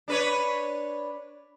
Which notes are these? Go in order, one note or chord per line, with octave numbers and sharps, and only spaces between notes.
D4 B4 C#5